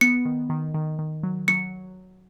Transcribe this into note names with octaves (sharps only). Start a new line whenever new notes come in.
B3 C#7
D#3
D#3
D#3
D#3
F#3
F#3 C#7